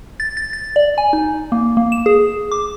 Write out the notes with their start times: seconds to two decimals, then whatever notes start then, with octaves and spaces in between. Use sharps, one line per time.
0.20 A6
0.37 A6
0.53 A6
0.76 D5
0.98 G#5
1.13 D#4
1.52 A#3
1.77 A#3
1.92 E7
2.06 G#4
2.52 D6